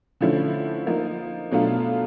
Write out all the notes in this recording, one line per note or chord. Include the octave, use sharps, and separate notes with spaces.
D3 F3 A3 C#4 E4
F3 A#3 D#4
B2 F#3 A3 D4 F4